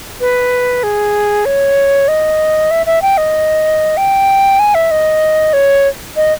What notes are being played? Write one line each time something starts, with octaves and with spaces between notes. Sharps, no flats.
B4
G#4
C#5
D#5
E5
E5
G5
D#5
G5
G#5
E5
D#5
C#5
D#5